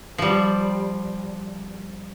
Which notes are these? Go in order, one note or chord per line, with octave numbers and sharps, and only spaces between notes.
F3 G3